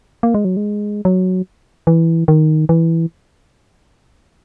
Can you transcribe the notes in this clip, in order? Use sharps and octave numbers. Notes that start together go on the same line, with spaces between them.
A#3
G#3
F#3
G#3
F#3
E3
D#3
E3